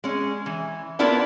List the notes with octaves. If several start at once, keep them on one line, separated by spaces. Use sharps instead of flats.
G#3 C#4
E3
B3 D4 E4 F4 A#4